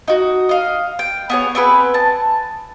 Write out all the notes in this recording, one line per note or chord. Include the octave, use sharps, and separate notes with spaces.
D#4 F#4
D#5 F5
G5
B3 G#4 C#5
B3 C4 G#4 B4
A5